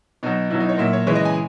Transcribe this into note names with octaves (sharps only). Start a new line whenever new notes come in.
B2 F#3 D#4
B2 F#3 E4
D#4
C#5
A#2 F#3 E5
C#5
C#3 E3 G#3 C#5
D#5
G#5